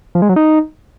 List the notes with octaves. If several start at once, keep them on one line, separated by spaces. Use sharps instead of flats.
F3
G#3
F#3
D#4